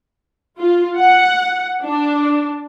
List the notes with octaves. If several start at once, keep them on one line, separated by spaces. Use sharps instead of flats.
F4
F#5
D4